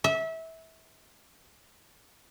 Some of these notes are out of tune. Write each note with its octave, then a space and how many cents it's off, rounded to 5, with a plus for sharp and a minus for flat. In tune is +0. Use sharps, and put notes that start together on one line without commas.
E5 -25